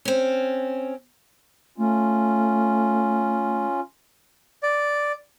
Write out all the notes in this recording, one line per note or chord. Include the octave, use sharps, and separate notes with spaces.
C4 C#4
A3 C#4 F4
D5